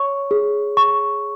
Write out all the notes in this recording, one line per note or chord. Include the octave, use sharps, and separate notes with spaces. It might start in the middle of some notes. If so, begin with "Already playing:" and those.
Already playing: C#5 C#6
G#4
C#6